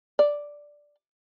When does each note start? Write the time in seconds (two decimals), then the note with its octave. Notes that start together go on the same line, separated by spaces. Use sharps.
0.19 D5